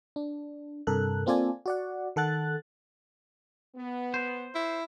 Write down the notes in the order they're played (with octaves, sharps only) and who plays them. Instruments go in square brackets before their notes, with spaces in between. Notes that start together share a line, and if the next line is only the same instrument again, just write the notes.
[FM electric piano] D4
G2 C3 A4 A#4 F#6
A#3 C4 F4 A4 D5 G#5
F#4 D5 F#5
D#3 A4 F#5 F#6 A6
[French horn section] B3
[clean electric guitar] C5
[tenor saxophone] E4